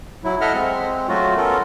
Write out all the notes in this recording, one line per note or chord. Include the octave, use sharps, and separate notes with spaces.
F#3 E4
A4 D#5 E5 F#5 F6
G#3 C4
F#3 A3 F4 F#4
B3 C#4 F4 A4 A#4